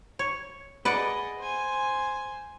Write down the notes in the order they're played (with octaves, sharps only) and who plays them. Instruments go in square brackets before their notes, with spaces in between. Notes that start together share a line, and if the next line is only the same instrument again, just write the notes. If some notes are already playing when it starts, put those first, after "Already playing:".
[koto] C#5
[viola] G#4 D#5 [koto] B4 D5 F#5
[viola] C5 G#5